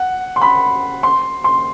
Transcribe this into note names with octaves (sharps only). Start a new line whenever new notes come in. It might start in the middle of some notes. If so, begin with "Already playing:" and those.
Already playing: F#5
C6
B5
C6
C6